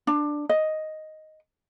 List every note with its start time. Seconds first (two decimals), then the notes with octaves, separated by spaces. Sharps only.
0.07 D4
0.49 D#5